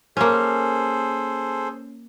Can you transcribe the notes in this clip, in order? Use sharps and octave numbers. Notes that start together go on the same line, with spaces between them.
A#3 C#4 G#4 A4 C5